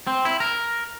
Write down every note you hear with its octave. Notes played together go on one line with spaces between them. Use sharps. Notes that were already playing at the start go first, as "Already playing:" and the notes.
C4
E4
A#4